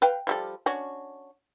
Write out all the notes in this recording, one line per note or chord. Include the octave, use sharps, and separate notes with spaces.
B4 F5 G5
F3 G3 A4
C#4 D4 F#4